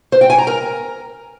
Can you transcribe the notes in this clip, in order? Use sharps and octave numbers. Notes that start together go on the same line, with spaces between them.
C5
G5
G#5
A#5
A#4